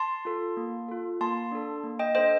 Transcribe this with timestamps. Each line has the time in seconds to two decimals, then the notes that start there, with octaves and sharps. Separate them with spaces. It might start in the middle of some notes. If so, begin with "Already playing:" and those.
Already playing: A5 C6
0.25 F4 A4
0.57 A#3
0.89 F4 A4
1.21 A#3 A5 C6
1.52 D4 A4
1.84 A#3
1.99 D#5 G5
2.15 D4 A4 C5 D#5